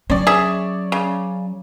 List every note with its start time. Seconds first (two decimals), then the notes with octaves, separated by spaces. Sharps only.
0.10 F#3 C#4 C#5 D5
0.27 G#4 E5
0.92 C#3